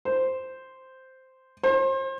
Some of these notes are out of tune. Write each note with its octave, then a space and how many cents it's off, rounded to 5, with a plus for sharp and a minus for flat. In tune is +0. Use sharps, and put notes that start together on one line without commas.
C5 -5
C5 +35